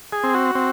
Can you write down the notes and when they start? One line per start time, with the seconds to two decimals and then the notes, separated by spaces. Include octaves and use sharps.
0.13 G#4
0.23 C4
0.35 F#4
0.55 C4